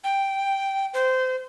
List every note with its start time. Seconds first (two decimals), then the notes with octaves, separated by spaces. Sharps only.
0.04 G5
0.94 C5